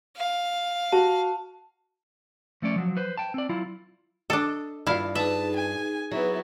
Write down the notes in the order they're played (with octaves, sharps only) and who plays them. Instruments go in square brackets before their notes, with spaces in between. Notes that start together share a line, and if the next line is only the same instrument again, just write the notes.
[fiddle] F5
[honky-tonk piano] F#4 [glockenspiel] A5
[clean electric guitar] F3 A3 C#4 D5
F3 F#3
B4 C5
G5 A5
C4 D5
F#3 E4 F4
[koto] D4 A4 [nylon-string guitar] D#5
[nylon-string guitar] G2 F4 [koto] E4 F5
[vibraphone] D#4 G#4 [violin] B4 A5 [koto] E5
[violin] G#5
[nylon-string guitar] F#3 [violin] B3 E4 [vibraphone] G#4